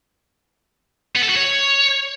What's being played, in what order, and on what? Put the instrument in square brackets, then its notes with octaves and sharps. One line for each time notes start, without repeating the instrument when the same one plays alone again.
[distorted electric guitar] B3
A4
F#4
C#5